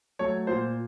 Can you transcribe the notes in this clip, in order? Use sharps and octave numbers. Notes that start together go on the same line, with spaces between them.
F#3 A3 C#5
A#2 C5